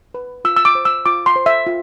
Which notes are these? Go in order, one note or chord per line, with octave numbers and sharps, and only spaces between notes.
B4
F4 E6
E6
D6
C5
E6
F4 D6
C6
C5
E5
F4